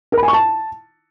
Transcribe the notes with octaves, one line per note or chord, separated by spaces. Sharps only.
A#4
B5
G#5
C#6
A5